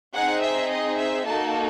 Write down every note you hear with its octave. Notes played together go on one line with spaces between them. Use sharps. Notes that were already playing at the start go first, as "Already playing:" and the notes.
C4 D#4 G#4 F#5
E5
D#5
E5
A#3 D#4 F#4 A4 A5